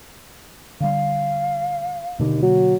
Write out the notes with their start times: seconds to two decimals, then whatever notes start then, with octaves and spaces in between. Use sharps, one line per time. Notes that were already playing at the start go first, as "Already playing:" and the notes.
0.81 D3 G3 F5
2.19 D#2 B2 D3 A#3
2.42 F#3